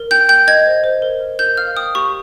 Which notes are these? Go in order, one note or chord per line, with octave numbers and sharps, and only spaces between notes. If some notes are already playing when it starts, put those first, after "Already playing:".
Already playing: A#4
G5 G6
G5 G6
D#5 G#6
C5
C5
A#4
A#4
A#4 G6
F5 F6
G5 D#6
G4 C#6